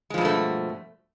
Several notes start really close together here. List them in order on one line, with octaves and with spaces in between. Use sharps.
G#3 F3 G2 B2 A3